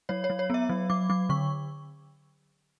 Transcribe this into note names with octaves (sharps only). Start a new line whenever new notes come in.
F#3 C#5
C#5
F#3
C#5
B3 E5
F#3
F#3 D6
F#3 D6
D3 C#6